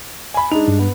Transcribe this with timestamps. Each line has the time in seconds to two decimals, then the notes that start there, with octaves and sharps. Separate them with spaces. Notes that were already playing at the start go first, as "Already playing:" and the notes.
0.34 G#5 B5
0.52 G#3 D4 D#4 F7
0.68 G2
0.79 B3